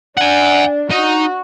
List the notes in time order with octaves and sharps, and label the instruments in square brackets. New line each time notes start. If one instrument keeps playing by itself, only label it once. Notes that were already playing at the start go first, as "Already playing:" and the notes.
[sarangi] D4 [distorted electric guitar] F#5 G#5
[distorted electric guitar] D#4 [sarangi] F#4